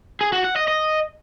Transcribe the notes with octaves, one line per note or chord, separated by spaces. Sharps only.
G#4
F#4
F#5
D#5
D#5